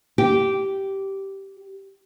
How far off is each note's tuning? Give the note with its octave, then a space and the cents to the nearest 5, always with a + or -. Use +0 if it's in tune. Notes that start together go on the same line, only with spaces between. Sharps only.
G4 -10